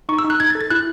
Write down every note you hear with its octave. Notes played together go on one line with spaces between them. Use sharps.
D#4 C#6
E6
D#4
F#6
D#4 G#6
A6
A4
A6
E4 F#6